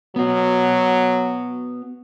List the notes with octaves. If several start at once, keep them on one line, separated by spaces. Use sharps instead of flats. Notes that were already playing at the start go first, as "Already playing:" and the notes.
F#3 B3 F#4